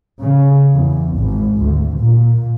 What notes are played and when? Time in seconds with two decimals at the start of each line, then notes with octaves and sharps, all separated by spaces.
0.21 C#3
0.75 E2
1.18 G#1
1.62 D2
2.00 A#2